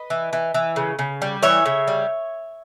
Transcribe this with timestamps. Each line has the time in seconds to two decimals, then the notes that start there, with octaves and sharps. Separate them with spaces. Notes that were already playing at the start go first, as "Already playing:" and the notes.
Already playing: B4 D#5
0.10 E3
0.33 E3
0.54 E3
0.76 C#3
0.99 C#3
1.22 G3
1.43 E3 C#5 E5
1.66 C#3
1.88 G3